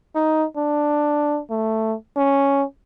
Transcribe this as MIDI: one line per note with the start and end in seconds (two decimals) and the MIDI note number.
0.15 0.45 63
0.57 1.39 62
1.50 1.94 57
2.17 2.63 61